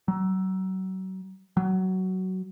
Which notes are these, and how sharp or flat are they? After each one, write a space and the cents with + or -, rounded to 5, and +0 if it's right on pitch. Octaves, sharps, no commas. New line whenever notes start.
F#3 +30
F#3 +15